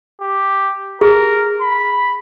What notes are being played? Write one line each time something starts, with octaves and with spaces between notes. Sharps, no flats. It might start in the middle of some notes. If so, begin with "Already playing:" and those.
G4
G#4 A#4
B5